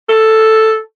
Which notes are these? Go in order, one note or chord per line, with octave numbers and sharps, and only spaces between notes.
A4